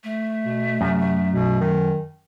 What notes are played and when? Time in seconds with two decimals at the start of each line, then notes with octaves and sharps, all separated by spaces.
0.04 A3
0.46 B2
0.81 F#2 C3
1.33 B2
1.61 D#3